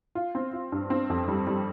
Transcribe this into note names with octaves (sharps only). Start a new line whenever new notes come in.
F4
C4
F4
G2
C4
F2
G3
G3